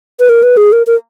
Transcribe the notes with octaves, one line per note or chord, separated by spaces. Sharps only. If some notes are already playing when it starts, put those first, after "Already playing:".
B4
A#4
B4
G#4
A#4
A#4